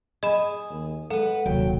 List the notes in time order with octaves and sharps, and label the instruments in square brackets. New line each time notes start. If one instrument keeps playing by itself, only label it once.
[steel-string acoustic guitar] G#4 [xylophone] D#5 B5
[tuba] D#2
[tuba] G#3 [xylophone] A4 [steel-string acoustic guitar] B4 F#5
[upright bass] D#1 C2 [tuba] F#3 [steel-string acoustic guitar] G5